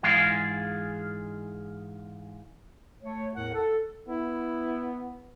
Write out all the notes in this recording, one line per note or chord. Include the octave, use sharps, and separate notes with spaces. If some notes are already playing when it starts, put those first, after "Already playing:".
G#2 E3 G#3 F4 G#4 F5
A3 C#5
E2 A2 A#4 F#5
A4
B3 E4